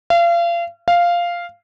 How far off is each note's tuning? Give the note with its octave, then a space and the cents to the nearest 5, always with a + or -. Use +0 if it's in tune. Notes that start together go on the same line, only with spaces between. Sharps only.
F5 -35
F5 -5